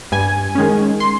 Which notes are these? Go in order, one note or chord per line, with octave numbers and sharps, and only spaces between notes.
G2 G#5
D#3 G#3 C#4
C6